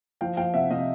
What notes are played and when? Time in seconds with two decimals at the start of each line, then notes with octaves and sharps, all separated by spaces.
0.21 F3 F5 G5
0.37 F3 F5 G5
0.54 C3 E5 F#5
0.70 C3 D#5 F5